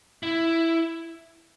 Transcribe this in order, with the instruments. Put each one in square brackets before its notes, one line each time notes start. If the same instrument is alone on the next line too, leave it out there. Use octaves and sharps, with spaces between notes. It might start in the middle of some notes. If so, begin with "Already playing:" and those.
[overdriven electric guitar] E4